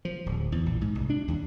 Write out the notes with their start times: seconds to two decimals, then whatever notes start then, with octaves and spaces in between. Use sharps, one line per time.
0.05 F3
0.26 D1
0.52 E2
0.66 A#1
0.81 G#2
0.95 C2
1.10 D4
1.28 D#2